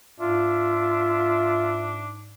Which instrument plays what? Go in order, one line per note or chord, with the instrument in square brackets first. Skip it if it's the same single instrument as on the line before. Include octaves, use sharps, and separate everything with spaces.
[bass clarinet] G#2 [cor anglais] D4 [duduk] F4 [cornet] E5